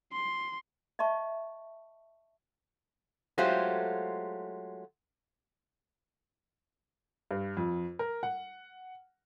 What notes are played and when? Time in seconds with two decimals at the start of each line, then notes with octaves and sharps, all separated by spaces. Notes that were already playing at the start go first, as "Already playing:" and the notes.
0.12 C6
0.99 D#5 E5 A5 C#6
3.38 F#3 G#3 A3 F4 G4 C5
7.31 G2
7.57 F2
7.99 A#4
8.23 F#5